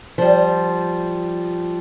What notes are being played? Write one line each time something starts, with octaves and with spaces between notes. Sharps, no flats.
F3 G3